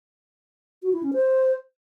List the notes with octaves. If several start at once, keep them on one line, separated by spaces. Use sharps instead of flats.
F#4
E4
C#4
C5